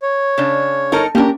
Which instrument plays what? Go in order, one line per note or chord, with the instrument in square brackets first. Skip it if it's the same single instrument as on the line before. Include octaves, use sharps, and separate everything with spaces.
[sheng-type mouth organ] C#5
[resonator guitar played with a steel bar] C#3 D4
[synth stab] G1 F6 C#7 [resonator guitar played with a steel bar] D#4 A4 A#4
[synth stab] A#3 C#4 D4 [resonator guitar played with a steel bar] G4 A#4